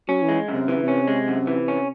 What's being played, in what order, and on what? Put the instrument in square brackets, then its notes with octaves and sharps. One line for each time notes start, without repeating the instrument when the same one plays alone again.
[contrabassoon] F#3 [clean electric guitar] C#4
[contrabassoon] E3
[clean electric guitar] G#3
F#2
[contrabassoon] C3
[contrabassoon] C3 [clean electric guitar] E3
[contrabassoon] C#3
[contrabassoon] C3 [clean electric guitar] C#4
[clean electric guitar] G#3
F#2
E3
C#4